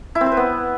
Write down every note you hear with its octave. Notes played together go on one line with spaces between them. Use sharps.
E4
C4
C5
B4
B3